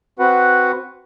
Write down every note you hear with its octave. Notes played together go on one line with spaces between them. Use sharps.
C4 F#4 B4 F#5